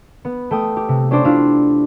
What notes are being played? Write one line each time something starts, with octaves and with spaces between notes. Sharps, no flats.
B3
A3 G5 D#6
G4
C3
C#4 D4 G4 A4 C5 D5
D4 E4 F4 F5